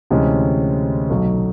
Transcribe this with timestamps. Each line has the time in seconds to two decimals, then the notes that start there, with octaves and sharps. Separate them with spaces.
0.11 D2 C3 E3 G#3 C#4
1.10 B1 B2 F#3 A3